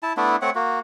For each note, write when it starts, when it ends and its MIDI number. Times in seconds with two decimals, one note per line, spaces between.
0.03 0.13 64
0.03 0.13 81
0.17 0.36 57
0.17 0.36 59
0.17 0.36 62
0.17 0.36 64
0.42 0.50 57
0.42 0.50 60
0.42 0.50 73
0.42 0.50 78
0.55 0.79 58
0.55 0.79 66